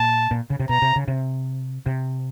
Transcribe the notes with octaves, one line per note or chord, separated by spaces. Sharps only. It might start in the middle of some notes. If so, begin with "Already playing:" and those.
Already playing: A#2 A5
A#2
C#3
C3
B2 A#5
C3
C#3
C3
C3